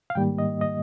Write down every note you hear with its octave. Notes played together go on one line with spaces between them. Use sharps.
F5
G#2 D#3 G3 A#3 G5
D#5
D#5